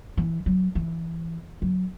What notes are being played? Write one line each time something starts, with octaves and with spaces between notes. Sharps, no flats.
E3
F#3
E3
F#3